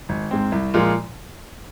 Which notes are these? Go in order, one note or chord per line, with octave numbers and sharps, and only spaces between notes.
G#1
G#2 G#3 C4
C2
A#2 F3 G#3 F4